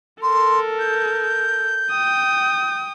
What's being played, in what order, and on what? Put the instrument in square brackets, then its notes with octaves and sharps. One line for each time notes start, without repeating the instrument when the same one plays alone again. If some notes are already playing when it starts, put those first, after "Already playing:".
[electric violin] A4 A#4 [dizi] C6
[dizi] G6
[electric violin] G5 D#6